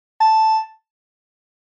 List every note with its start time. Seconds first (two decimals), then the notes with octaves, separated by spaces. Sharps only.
0.20 A5